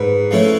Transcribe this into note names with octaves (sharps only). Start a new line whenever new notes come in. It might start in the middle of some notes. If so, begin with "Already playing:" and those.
Already playing: G#2 B4
F3 A3 C#4 E4